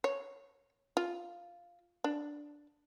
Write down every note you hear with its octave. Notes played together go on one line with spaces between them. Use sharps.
C#5
F4
D4